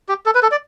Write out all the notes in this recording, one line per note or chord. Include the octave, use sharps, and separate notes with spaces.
G4
A4
B4
A4
D5